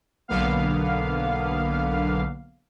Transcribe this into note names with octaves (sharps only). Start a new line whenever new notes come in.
B1 D3 A#3 B3 F5